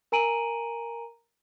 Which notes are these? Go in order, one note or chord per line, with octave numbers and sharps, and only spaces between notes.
A#4 G#5 A#5 D7 D#7 F#7